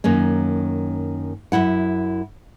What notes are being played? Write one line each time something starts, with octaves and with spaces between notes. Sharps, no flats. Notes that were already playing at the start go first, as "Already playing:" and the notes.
F#2 D#3 A#3 C#4
F#2 E3 E4 F#5